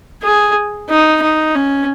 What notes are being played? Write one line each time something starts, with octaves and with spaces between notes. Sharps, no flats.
G#4
D#4
D#4
C#4